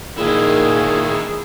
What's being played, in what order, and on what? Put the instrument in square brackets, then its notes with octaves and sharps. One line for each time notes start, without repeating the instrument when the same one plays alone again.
[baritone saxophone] A#2 [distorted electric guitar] D#3 E4 [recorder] G#4